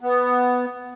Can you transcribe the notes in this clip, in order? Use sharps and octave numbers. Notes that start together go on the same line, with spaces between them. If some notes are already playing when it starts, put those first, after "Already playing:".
B3